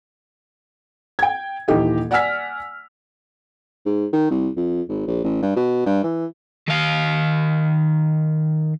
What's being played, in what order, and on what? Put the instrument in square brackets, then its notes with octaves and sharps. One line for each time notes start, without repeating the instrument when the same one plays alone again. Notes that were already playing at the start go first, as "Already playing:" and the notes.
[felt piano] G5 G#6
D#1 E3 D#4 G4 D#5
D5 F#5 G#5 E6 F6 B6
[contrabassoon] G#2
D#3
C2
F2
G#1
A#1
A1
G2
B2
G2
E3
[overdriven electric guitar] D#3 F5